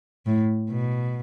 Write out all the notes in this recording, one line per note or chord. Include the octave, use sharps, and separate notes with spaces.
A2
B2